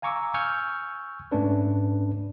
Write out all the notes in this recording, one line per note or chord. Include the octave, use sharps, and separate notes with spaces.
F5 G#5 A#5 C#6 D6 E6
G#5 C#6 E6 F6 G6
G#2 A3 C#4 D4 B4